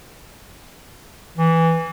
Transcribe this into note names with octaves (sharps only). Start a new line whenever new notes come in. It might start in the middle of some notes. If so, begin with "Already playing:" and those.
E3